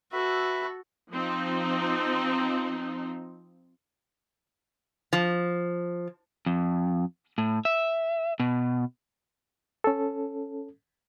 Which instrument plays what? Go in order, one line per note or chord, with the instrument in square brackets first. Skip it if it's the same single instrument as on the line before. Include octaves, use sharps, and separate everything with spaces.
[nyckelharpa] F#4 A4 [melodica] B4 E5
[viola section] F3 C4 D#4
[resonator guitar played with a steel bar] F3
[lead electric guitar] F2
A2
E5
B2
[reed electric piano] C#4 A4